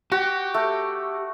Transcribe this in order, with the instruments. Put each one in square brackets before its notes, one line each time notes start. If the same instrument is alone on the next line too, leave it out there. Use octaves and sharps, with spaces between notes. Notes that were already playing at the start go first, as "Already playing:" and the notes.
[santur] F#4 [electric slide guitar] G4
[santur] A3